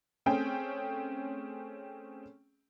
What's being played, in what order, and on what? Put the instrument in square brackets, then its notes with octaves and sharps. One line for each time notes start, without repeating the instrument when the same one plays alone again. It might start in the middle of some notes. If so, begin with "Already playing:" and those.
[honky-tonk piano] A3 C4 C#4 G#4 G5